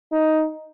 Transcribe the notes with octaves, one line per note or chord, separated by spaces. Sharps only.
D#4